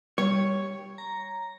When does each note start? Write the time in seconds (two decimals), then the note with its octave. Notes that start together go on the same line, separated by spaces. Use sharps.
0.18 G3 C#5
0.98 A#5